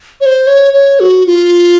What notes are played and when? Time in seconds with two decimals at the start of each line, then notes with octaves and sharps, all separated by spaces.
0.21 C#5
0.26 C5
0.47 C#5
0.74 C#5
1.00 F#4
1.27 F4